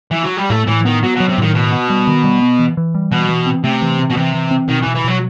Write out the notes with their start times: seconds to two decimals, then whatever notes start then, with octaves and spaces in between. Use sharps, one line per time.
0.11 E3
0.23 F#3
0.37 G3
0.50 A2 A3
0.67 A2 E3
0.85 D#3 B3
1.03 F#3 B3
1.15 B2
1.20 F#3
1.29 C3
1.38 A2 D#3
1.55 B2 D#3
1.72 B3
1.90 G3
2.07 D#3
2.24 G3
2.42 B3
2.59 E3
2.77 E3
2.95 G3
3.12 B2 E3
3.29 E3
3.46 C4
3.64 C3 A3
3.82 E3
3.99 C4
4.10 B2
4.16 C3 E3
4.34 E3
4.51 C4
4.68 B2 D#3
4.82 B2 E3
4.95 E3
5.04 B2 F#3